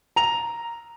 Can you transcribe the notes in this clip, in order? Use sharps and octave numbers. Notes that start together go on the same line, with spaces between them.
A#5 F7